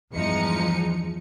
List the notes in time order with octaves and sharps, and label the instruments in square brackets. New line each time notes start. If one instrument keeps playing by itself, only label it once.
[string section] E2 G2 F3 G#3 D#4 C#7